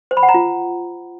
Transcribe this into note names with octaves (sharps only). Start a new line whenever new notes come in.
C5
B5
F#5
A#5
F4